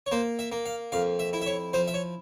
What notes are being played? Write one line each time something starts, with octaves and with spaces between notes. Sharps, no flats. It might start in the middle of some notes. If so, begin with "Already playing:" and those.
C#5
A#3 C5
E5
A#3
F5
F2 F5
E5
E4
E5
C#5
F3 C5
E5
C#5